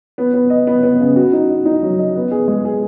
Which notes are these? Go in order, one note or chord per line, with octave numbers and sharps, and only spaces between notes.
B3
B3
D#5
B3
B3
C#3
F#4
D#4
D#4
D#4
F#3
D#5
B3
G#4
G#3
G#4